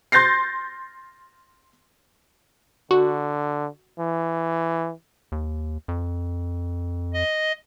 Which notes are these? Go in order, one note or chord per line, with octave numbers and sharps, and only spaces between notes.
C6 G6 A6 A#6 C7
D3 F#4
E3
D#2
F2
D#5